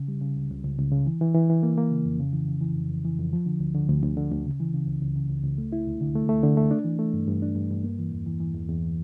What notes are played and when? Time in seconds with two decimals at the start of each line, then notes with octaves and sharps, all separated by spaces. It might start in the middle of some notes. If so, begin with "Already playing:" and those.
Already playing: C#3
0.08 G3
0.21 C#3
0.36 C#2
0.50 C#2
0.64 C#2
0.78 C#2
0.92 C#3
1.06 E3
1.21 E3
1.34 E3
1.50 E3
1.63 A#3
1.78 A#3
1.91 C#3
2.05 F2
2.20 C#3
2.33 E3
2.48 C#3
2.61 E3
2.75 F2
2.90 F2
3.05 E3
3.19 F2
3.33 F3
3.46 D3
3.60 D2
3.75 D3
3.89 D2
4.03 D2
4.17 D3
4.32 D2
4.45 C#3
4.60 E3
4.74 C#3
4.87 C#2
5.02 C#2
5.15 C#3
5.29 C#2
5.43 C#2
5.58 A3
5.72 E4
5.87 D2
6.01 D3
6.15 A3
6.29 A3
6.43 D3
6.57 A3
6.71 D4
6.85 E3
6.99 A3
7.14 G2
7.28 G2
7.42 D4
7.55 G2
7.70 G2
7.84 A#3
7.99 E3
8.12 E2
8.26 E3
8.40 E3
8.55 E2
8.69 E2